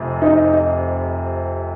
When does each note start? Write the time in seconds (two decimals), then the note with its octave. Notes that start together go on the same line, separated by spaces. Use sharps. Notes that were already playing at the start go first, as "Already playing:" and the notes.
Already playing: F1 F2 C3
0.22 D#4